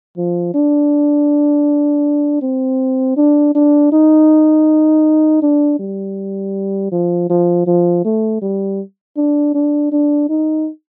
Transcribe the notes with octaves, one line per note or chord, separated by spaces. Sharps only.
F3
D4
C4
D4
D4
D#4
D4
G3
F3
F3
F3
A3
G3
D4
D4
D4
D#4